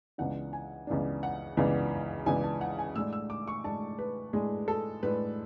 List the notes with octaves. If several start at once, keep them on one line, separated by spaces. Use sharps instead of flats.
C#2 C#3 E3 B3 D4 F#5
G#5
C#2 C#3 E3 B3 D4
F#5
C#2 C#3 E3 B3 D4
C#2 C#3 E3 B3 D4 G#5
A5
F#5
G#5
A2 G#3 D4 E6
E6
D6
C#6
A2 G#3 D4 A5
B4
A2 G#3 D4 G#4
A4
A2 G#3 D4 B4